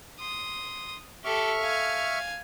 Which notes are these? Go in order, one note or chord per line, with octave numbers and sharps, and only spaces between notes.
C6 D#6
G4 A4 E5 C#6 F6
F5 G#5